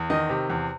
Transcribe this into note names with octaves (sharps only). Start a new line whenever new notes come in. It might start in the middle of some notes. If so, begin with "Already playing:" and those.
Already playing: E2
D#3 D#5
C3
E2